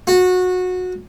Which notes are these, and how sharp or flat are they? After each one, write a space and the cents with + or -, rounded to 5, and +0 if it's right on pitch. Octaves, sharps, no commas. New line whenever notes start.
F#4 -20